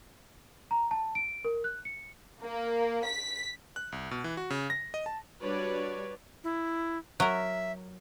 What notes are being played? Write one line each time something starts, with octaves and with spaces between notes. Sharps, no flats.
A#5
A5
D7
A#4
F#6
C#7
A#3
B6
F#6
C2
B2
E3
F#4
C#3
A#6
D#5
A5
G3 D4 F#4 B4 C#5 D5
E4
F#3 A#4 E5